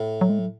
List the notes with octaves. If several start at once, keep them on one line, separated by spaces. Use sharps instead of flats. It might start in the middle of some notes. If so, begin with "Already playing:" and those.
Already playing: A2
F#3
G#3
F#3